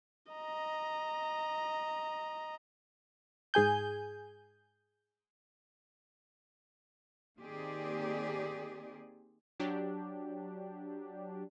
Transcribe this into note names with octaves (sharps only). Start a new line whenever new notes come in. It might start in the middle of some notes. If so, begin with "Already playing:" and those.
D#5 A#5
G#2 G#4 G#5 G6
D#3 A#3 C4 G4 G#4 D5
F#3 D4 G4